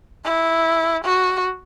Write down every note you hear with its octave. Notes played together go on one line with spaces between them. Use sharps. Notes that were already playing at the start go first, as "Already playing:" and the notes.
E4
F#4